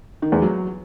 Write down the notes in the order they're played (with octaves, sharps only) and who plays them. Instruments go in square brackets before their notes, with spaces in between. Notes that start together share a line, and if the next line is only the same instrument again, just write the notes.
[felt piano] D#3
E2
F#3